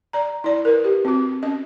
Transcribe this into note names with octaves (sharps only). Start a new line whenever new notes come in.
D5 A#5
E4 D5
A#4 B4
G4
C4 F#4
C#4 D#5